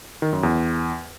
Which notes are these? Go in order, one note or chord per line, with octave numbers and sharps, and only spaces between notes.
D#3
F#2
E2